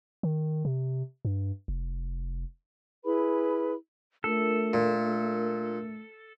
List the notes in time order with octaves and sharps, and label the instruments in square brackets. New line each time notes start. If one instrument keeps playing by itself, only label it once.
[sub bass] D#3
C3
G2
F1
[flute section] E4 G#4 B4 B5
[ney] A3 [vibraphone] D4 F4 A#4 [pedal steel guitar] A4
[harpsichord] A#2